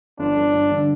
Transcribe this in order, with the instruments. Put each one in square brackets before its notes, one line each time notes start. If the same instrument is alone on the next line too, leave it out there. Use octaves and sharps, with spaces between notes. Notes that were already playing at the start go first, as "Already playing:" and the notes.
[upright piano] G1 [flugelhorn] D4
[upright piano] G1
G2
D3